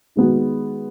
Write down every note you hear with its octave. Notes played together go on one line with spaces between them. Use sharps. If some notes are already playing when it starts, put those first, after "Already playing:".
D#3 G#3 B3 F#4